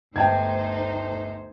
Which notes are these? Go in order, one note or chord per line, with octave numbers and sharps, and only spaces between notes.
G1 D2 D#4 C5 G5 A5 G#6